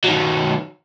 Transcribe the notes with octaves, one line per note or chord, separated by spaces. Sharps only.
D#3 F#3